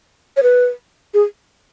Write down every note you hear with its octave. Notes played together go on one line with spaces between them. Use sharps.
C#5
B4
G#4